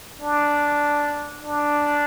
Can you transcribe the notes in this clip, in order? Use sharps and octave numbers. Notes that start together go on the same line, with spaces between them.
D4
D4